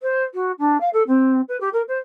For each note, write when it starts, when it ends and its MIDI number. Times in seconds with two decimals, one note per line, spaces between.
0.02 0.24 72
0.34 0.52 66
0.59 0.80 62
0.80 0.89 77
0.93 1.03 69
1.07 1.41 60
1.48 1.59 71
1.60 1.69 67
1.73 1.82 70
1.88 1.98 72